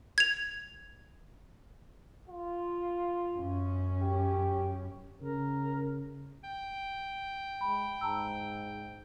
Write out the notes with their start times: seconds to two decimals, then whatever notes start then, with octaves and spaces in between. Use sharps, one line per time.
0.18 G#6 F7
2.30 F4
3.34 F#2 C#4
4.03 G4
5.22 C#3 A#4
6.44 G5
7.61 G#3 B5
8.01 G#2 A5 A#5 E6